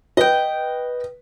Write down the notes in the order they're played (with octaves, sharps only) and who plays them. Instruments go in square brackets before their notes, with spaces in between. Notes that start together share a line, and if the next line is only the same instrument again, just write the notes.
[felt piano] B4 [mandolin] D#5 G5